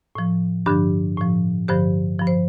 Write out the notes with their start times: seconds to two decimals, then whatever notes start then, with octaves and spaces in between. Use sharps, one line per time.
0.15 A2 F3
0.66 G2 D3 F3 D4 G4
1.18 A2 F3
1.68 G2 D3 F3 G4 C5
2.19 G2 F3
2.27 C5